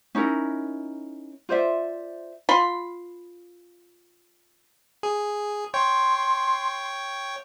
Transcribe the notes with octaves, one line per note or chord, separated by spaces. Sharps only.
C#4 D#4 E4 A#4
F4 C5 D5 E5
F4 B5 C6
G#4
C#5 G5 C6